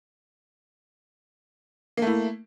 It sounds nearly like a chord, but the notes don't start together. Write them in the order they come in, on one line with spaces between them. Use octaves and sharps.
A#3 A3 E4